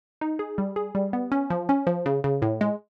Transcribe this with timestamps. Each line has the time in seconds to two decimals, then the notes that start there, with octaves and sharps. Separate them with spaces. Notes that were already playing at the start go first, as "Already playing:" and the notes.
0.21 D#4
0.39 G#4
0.58 G3
0.76 G#4
0.95 G3
1.13 B3
1.32 C#4
1.50 F3
1.69 C#4
1.87 F3
2.06 C#3
2.24 C#3
2.42 A2
2.61 G#3